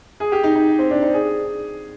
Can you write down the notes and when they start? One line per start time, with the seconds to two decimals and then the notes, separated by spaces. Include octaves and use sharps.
0.20 G#4
0.32 G4
0.44 D#4
0.55 D#4
0.79 C4
0.91 D4
1.02 D#4
1.14 G#4